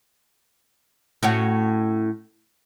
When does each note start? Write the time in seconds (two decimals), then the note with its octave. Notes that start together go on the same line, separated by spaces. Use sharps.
1.23 A2 C#4 F#4